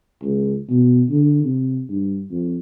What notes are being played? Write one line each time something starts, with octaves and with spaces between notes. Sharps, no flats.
C#2
B2
D3
C3
G2
F2